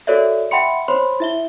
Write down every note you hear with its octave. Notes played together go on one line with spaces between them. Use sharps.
F#4 A4 A#4 C#5 D5 E5
E5 F#5 G5 B5 C6 C#7
C5 C#5 B5 C6
E4 E5 G7